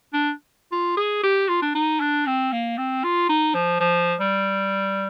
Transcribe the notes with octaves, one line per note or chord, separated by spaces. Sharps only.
D4
F4
G#4
G4
F4
D4
D#4
D4
C4
A#3
C4
F4
D#4
F3
F3
G3